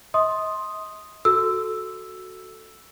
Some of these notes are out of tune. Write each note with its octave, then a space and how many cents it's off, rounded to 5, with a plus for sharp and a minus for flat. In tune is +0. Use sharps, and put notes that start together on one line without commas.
D#5 +45 C6 +10 D#6 +0
F#4 +0 A4 +0 E6 +0